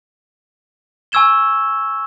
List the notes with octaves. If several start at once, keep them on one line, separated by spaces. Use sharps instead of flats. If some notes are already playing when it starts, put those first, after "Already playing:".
G#5 C#6 E6 G#6 E7 G7